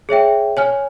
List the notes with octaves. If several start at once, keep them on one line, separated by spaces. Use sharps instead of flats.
G#4 C#5 E5 G5
C#5 G#5 F6